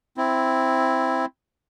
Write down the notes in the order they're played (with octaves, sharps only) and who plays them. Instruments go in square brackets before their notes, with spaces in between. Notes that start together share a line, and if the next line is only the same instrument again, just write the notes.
[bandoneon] C4 E4